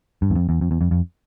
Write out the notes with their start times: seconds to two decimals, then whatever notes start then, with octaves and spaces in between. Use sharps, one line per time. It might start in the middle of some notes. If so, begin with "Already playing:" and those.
0.22 G2
0.30 E2
0.36 F2
0.49 E2
0.61 F2
0.71 E2
0.81 F2
0.91 F2